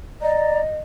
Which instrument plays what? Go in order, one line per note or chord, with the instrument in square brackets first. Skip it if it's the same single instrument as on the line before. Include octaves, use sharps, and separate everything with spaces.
[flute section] D5 A#5 [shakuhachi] D#5